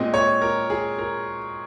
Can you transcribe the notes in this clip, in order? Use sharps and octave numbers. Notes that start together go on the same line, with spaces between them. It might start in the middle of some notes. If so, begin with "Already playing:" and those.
Already playing: A#2 G#3 C4 D#5
C#5
A#4
G#4
A#4